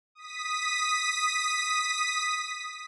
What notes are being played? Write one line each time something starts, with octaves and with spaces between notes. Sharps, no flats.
D#6 B6